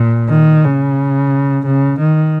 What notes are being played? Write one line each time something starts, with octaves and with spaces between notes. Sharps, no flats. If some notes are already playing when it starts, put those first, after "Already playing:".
Already playing: A#2
D#3
C#3
C#3
D#3